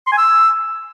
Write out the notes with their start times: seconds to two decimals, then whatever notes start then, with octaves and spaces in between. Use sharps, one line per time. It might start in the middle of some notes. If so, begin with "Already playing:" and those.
0.07 C6
0.12 G#5
0.18 E6